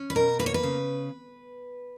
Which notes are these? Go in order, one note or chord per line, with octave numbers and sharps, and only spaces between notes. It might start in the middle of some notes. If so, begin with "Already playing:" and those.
Already playing: C#4
B4
B2 A#4
A#3 B4
C#5
B4
C#3